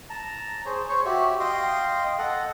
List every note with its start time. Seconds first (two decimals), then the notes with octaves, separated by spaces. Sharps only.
0.10 A5 A#5
0.66 G#4 C5 C#5
0.89 C5 C#5 C#6
1.05 F#4 G4 E5
1.40 D#5 F5 G5 C6
2.18 A4 D#5 F#5